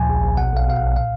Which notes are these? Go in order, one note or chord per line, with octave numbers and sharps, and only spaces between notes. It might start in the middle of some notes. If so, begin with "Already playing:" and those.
Already playing: D2 A#2 F3 G#5
A#1
A#1
B2 F#5
B1 F5
B2 F5
B1 F#5
A#2 F5